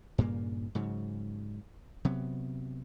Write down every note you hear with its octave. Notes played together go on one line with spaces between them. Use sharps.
G2 A#2 C#3 A#3
G#2 C#3 F#3
C3 F#3 B3